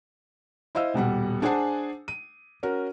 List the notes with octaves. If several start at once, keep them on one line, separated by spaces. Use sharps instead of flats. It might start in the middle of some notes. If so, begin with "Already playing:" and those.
E4 C5 D#5 F5 E6
D#1 B2 G3 F#5
D4 G#4 C5 F#5 G#5 A5
D#7
C#4 F#4 A#4